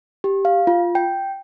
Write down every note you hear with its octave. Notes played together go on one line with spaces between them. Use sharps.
G4
F5
F4
G5